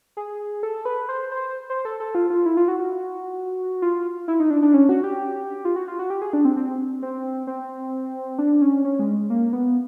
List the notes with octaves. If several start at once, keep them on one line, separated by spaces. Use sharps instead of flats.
G#4
A4
B4
C5
C5
C5
A4
A4
F4
F4
E4
F4
F#4
F#4
F4
E4
D#4
D4
D4
C#4
F#4
G4
F4
F#4
F4
F#4
G4
G#4
D4
C4
C4
C4
C4
D4
C#4
C#4
G#3
A#3
B3